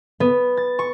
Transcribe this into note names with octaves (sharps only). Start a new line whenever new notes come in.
B3
A6
C#6